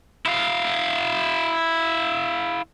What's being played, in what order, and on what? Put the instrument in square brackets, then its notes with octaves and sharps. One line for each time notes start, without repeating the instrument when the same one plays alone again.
[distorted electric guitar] E4 F5